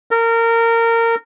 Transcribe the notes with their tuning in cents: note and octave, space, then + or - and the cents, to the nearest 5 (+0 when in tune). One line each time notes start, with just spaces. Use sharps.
A#4 -20